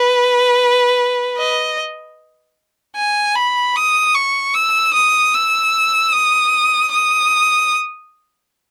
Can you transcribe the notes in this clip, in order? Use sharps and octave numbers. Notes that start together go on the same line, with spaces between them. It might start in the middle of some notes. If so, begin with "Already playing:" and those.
Already playing: B4
D#5
G#5
B5
D#6
C#6
E6
D#6
E6
D#6
D#6